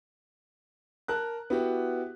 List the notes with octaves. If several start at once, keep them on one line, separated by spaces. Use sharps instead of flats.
A#4 A5 F#6
B3 E4 F#4 G4